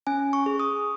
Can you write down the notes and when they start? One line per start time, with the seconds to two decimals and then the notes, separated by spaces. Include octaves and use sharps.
0.07 C#4 G#5
0.33 C#6
0.46 G#4
0.60 D#6